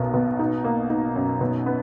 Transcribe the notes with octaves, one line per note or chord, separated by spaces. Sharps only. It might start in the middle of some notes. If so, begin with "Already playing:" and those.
Already playing: B1 B2 A#3
B2
D#4
A#3
D#4
F#2
B2
B3